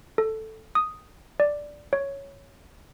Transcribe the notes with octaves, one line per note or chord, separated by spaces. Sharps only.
A4
D#6
D5
C#5